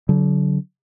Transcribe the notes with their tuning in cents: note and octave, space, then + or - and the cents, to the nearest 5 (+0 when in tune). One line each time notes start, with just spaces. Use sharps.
D3 -35 F#3 +0